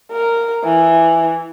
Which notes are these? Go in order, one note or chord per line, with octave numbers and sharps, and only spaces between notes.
A#4
E3